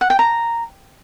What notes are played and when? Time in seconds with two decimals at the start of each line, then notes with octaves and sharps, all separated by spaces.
0.01 F#5
0.10 G5
0.19 A#5